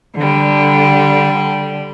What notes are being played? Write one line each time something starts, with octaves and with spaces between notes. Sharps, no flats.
D3 G3